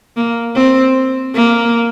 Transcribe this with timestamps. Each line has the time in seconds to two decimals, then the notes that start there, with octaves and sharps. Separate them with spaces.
0.17 A#3
0.56 C4
1.35 A#3